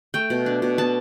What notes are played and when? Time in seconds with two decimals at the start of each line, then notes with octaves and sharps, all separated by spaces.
0.14 A3 G5
0.30 B2
0.46 D4
0.62 B2
0.78 B3 A5